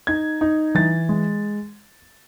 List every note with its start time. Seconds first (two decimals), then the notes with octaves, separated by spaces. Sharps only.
0.07 D#4 G#6
0.41 D#4
0.75 E3 A6
1.09 G#3